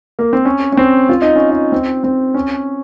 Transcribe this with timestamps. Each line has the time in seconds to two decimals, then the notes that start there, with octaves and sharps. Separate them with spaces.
0.19 A#3
0.33 C4
0.45 C#4
0.72 C#4
0.77 C4
1.09 F4
1.22 D#4
1.36 C#4
1.50 D#4
1.72 C4
2.04 C4
2.34 C#4